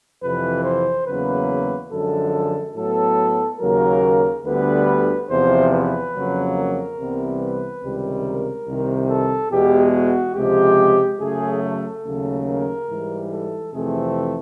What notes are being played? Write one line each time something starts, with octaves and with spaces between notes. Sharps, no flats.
F2 C3 E3 B4
C5
E2 C#3 F#3 A#3 B4
F#2 D3 F3 G#3 A4
A2 F#3 B3 A4
D#2 C#3 F#3 A#3 A#4
D2 D3 G3 B3 B4
E2 C3 F3 C5
B4
F2 C#3 F#3 A#3
A#4
C2 C3 E3 G3 B3
B4
C#2 C3 D#3 G3
A#4
C2 C3 D#3
A4
E2 B2 G#3 G4
F#4
C#2 C3 F3 G#3 G4
F#2 C#3 F#3 A3 G#4
A4
D#2 C#3 F#3 A3
A#4
G#2 E3 G3
A4
F2 C3 E3 A3 C4 G#4